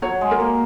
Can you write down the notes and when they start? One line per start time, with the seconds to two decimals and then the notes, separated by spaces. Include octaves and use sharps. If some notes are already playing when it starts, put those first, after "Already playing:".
0.02 F#3 C#5
0.21 G#3
0.31 A#4
0.40 A#3